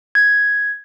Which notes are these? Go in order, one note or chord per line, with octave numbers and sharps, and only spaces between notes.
G#6